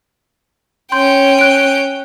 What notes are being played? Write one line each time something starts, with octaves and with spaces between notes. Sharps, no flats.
C#4 G5 C6 G6
F#6 D7